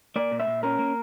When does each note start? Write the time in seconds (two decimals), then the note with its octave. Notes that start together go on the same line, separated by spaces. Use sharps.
0.16 A#3 D5
0.32 A#2
0.40 E5
0.47 A#2
0.63 C#4 A#4
0.79 A#3